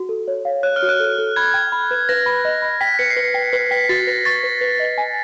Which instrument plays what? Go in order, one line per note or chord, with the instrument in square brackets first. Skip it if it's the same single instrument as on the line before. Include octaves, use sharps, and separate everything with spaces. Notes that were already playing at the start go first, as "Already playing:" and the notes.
Already playing: [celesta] F#4
A4
C#5
F5
[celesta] C#5 [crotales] F#6
[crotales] F6
[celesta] F#4
[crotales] F#6
[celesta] A4
A4
[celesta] B5 [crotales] G#6
[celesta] G5
B5
B4
[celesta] B4 [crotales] A#6
[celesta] B5
D#5
B5
[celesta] G5 [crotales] B6
[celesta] B4 [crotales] C#7
[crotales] C7
[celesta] B4 [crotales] C#7
[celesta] G5 [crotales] C#7
[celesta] B4 [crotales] C7
[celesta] G5 [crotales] B6
[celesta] F#4 [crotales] A6
[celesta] B4 [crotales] A#6
[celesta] C#6 [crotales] A6
[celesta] B4
B4
D#5
G#5